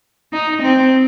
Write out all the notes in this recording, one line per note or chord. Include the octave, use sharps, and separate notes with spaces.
D#4
C4